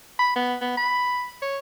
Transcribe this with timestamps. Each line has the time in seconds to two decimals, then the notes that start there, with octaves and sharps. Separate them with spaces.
0.19 B5
0.36 B3
0.61 B3
0.77 B5
1.42 C#5